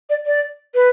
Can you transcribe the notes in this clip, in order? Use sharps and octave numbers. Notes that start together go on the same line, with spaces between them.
D5
D5
B4